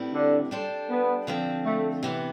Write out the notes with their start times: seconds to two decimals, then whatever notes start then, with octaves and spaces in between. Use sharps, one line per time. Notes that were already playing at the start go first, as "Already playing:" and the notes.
Already playing: A2 G3 C4 E4 B4
0.13 D3
0.51 G3 D4 A4 C5
0.90 B3
1.27 D3 F3 C4
1.65 A3
2.03 C3 E3 B3